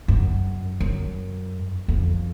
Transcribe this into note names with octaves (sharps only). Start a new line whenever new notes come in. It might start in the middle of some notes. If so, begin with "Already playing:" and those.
F#2
F#2
F2